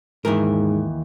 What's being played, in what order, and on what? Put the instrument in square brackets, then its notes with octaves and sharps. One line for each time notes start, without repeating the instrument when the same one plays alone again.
[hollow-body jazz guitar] D#2 E3 A#4 [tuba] G#2